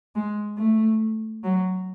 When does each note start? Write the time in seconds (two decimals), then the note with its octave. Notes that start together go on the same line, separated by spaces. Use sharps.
0.15 G#3
0.58 A3
1.44 F#3